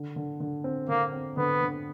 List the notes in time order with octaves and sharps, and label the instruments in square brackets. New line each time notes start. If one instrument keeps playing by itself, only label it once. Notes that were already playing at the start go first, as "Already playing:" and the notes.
Already playing: [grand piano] D3
D3
D3
C4
[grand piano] D3 [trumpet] A#3
[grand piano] C4
[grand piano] D3 [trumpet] B3
[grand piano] D3